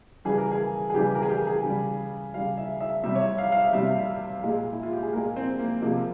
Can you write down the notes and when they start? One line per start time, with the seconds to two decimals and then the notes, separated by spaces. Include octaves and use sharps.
0.25 C#3 E3 G3 G#4
0.38 A#4
0.51 G#4
0.90 G#4
0.95 C#3 E3 G3 G4
1.15 A#4
1.22 G#4
1.29 G4
1.47 G#4
1.64 C#3 G3
2.34 C#3 G3 F5
2.57 E5
2.80 E5
3.03 C3 G3 E5
3.15 C#5
3.21 E5
3.38 F5
3.52 F5
3.55 E5
3.73 C3 G3 E5
4.44 A#2 G#3
4.73 E4
4.83 F4
4.93 G4
5.03 G#4
5.13 A#2 G#3 A#4
5.36 C4
5.59 A#3
5.82 C3 F3 G#3 A#3